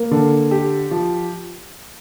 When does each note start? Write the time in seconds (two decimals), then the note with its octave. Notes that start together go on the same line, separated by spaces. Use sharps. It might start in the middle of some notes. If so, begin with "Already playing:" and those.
Already playing: A#3
0.11 D3
0.51 G4
0.91 F3